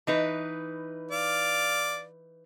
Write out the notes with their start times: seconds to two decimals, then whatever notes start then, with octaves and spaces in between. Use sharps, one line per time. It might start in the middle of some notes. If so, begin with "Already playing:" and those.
0.07 E3 D#4 B4
1.11 D5 F5